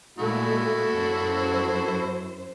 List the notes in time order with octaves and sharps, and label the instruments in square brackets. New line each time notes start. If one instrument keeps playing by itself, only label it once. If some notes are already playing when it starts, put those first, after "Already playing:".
[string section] A#2 G#3 A3 [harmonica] E4 F#4 A4
[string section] F#2 C5